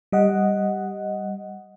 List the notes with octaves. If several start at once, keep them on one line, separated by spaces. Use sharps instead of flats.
G3 D#5 F#5